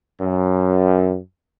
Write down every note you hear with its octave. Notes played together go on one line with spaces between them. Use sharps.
F#2